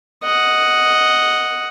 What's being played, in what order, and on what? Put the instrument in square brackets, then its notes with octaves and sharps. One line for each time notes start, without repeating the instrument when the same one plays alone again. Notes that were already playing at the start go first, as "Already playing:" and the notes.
[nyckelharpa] D#5 F#5